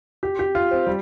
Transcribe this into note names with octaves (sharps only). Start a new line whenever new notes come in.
G4
G4
F4
C4
G3